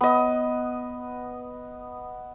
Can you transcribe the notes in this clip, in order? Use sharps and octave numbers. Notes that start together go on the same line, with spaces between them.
B3 D#5